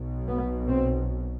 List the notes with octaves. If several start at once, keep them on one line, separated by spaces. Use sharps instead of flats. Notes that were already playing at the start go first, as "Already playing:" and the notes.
Already playing: B1 B2
B3
C4